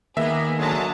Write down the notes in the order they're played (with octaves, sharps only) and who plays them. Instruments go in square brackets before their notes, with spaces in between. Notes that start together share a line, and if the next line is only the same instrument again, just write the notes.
[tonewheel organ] D#3 A#3 [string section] B3 G#4 [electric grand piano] E5
[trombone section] D3 F#3 G#3 [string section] D#5 A5 A#5